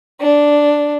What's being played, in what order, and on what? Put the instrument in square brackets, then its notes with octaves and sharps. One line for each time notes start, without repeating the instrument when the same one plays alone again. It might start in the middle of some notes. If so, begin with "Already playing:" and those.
[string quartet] D4